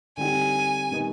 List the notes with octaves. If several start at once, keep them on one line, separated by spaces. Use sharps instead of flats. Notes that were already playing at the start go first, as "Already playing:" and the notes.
D3 G3 C4 D#4 G4 G#5
D#3 G3 B3 D#4